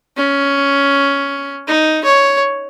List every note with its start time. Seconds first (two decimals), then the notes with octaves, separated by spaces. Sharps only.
0.17 C#4
1.68 D#4
2.05 C#5